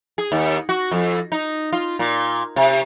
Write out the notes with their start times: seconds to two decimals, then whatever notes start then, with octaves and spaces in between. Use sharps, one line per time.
0.18 G#4
0.32 D#2
0.69 F#4
0.92 F2
1.32 D#4
1.73 F4
1.99 A#2
2.56 C3